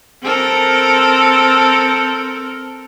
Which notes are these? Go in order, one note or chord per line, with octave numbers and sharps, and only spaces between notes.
C4 A4 A#4